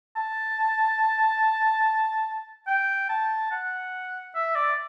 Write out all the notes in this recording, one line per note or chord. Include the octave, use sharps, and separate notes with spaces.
A5
G5
A5
F#5
E5
D5